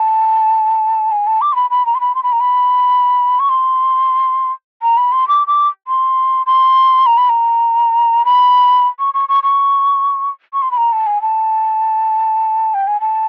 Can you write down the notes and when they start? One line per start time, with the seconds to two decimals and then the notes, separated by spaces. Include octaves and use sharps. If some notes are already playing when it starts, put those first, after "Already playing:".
Already playing: A5
1.11 G#5
1.27 A5
1.41 D6
1.52 C6
1.56 B5
1.70 B5
1.86 A#5
1.95 C6
2.01 B5
2.15 C6
2.23 B5
2.32 A#5
2.40 B5
3.39 C#6
3.49 C6
4.82 A#5
4.97 B5
5.12 C6
5.28 D6
5.47 D6
5.88 C6
6.46 C6
7.06 A#5
7.17 B5
7.29 A#5
8.25 B5
8.99 C#6
9.14 C#6
9.29 C#6
9.43 C#6
10.53 C#6
10.62 C6
10.71 B5
10.77 A#5
10.92 A5
11.06 G#5
11.22 A5
12.74 G5
12.87 G#5
13.01 A5